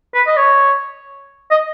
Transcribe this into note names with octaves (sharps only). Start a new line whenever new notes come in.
B4
D#5
C#5
D#5